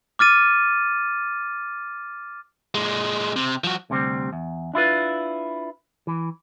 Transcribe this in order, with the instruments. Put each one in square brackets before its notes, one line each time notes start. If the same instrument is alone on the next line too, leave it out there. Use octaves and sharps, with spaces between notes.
[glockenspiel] D6 F6 A6 D#7
[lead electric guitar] A#2 G#3
C3
F3 F#4
[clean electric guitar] D2 C3 G3 C4
E2
D4 E4 F4 B4
E3